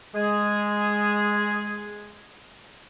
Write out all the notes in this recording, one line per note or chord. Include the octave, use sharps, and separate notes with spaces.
G#3 G#4